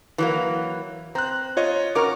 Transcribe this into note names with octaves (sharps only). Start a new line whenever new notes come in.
E3 F#3 A#3
C4 A#5 F#6
F4 C#5 D#5
C#4 F#4 A#4 C#6 D6